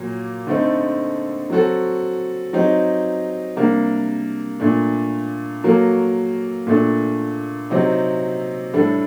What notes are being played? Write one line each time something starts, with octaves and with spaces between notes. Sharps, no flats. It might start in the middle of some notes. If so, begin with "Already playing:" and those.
Already playing: A#2 F#3 A#3
D3 A3 C4 D#4
F#3 C4 F#4 A4
F#3 C4 D#4 G4
C3 G3 A#3 D4
A#2 A3 D4
F#3 A#3 F#4 A4
A#2 A3 D4 A4
C3 F#3 C4 D#4
A2 G3 D4 A4